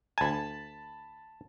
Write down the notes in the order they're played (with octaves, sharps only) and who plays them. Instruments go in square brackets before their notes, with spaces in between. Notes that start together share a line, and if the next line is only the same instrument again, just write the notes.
[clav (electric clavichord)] D2 G#5 [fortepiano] A5 B5